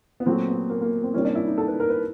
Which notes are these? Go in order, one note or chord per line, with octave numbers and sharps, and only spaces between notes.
B3
A#2 F#3 A3 C4
B3
A#3
A#3
C4
C3 D#3 G3 A#3 C#4
D4
E4
D#4
A4
B4
A#4
B4